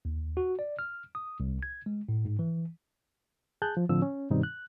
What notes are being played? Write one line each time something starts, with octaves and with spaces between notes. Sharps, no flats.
D#2
F#4
D5
F6
D#6
C2
G#6
G#3
A2
G#2
E3
G#4 A5 F#6 G6
F3
A2 D3 F3 C4 E6
C#4
G2 B2 D#3 G3 C4 D#4
F#6